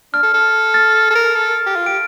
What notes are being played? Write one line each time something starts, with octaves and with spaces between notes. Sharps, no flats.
D4 F6
A4
A4
F6 A6
A4
A#4
A4
G4
F4
G4 D7